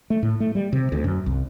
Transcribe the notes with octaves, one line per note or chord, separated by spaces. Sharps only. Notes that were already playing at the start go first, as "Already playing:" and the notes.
A3
A2
A3
G3
C3
D2
F#2
C2